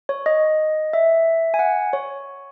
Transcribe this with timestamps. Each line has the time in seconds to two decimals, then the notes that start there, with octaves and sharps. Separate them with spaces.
0.09 C#5
0.26 D#5
0.93 E5
1.54 G#5
1.59 F#5
1.93 C#5